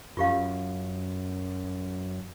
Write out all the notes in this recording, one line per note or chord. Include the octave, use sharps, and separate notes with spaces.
F#2 F4 G4 F5